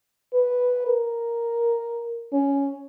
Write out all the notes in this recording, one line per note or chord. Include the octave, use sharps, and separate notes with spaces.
B4
A#4
C#4